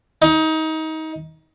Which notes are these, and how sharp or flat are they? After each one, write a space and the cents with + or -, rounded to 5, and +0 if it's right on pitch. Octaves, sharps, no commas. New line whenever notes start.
D#4 +25